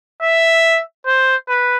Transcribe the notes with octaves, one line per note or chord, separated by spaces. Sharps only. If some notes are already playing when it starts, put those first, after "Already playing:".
E5
C5
B4